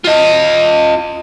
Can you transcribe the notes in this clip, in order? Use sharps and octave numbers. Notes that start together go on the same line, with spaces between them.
F4 D#5